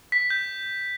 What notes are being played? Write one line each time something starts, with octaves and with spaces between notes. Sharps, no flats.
B6
G6